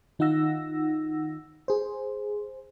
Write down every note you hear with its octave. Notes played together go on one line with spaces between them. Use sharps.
D#3 D#4 F4 F#5 E6 A#6
G#4 C5